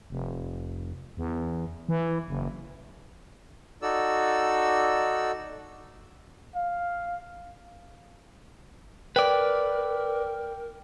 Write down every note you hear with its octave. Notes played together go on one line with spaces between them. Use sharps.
F1
E2
E3
F#1
D#4 F#4 A4 D5 E6
F5
A#4 B4 D5 G5